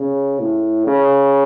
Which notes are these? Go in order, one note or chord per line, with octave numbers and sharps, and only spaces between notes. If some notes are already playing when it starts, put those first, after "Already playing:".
Already playing: C#3
A2
C#3